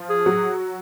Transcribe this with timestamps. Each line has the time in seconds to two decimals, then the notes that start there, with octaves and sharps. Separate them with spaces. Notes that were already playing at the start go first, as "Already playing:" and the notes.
Already playing: F3 F4
0.10 G#4
0.26 F#3 F#4